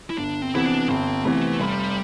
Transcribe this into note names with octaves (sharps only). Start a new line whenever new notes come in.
E4
G1 D4
C4
F2 C3 E3 B3 E4
D4
G1 C4
F2 C3 E3 A3 B3
F1 G3